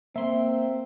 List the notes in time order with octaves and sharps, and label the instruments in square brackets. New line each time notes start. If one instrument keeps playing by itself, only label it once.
[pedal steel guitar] A#3 C6 [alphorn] C4 [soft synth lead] E5